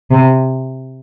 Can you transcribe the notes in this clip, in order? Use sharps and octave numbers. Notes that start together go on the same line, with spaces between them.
C3